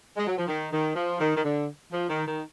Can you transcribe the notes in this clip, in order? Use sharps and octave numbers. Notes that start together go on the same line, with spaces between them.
G#3
F#3
F3
D#3
D#3
F3
D#3
D#3
D3
F3
D#3
D#3